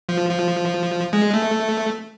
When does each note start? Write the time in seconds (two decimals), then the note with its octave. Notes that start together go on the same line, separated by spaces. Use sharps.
0.09 F3
0.30 F3
1.13 G#3
1.34 A3